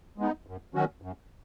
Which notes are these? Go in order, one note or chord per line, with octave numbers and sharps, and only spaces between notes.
G#3 B3 D#4
F#2
D#3 F#3 C#4 F#4
F#2